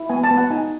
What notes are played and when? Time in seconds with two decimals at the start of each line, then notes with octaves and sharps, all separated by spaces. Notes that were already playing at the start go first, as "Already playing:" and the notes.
Already playing: E4
0.10 B3 G#5
0.24 A5
0.31 B3
0.38 F#5
0.51 D#4 G#5